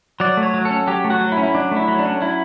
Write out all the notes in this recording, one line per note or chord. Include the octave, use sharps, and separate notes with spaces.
F#3 D5
A3
C#5
F#3
A4
C#4
F#3 G4
A3
F#4
F#3
E4
C#4
E4
F#3 D4
A3
E4
F#3
D4
C#4
F#3 E4